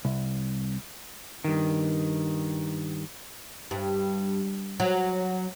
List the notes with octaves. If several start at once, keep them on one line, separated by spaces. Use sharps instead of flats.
C2
G2 D#3
G2
F#3